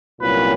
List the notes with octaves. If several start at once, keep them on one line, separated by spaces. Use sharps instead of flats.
C2 A#2 F#3 A#3 C#4 B4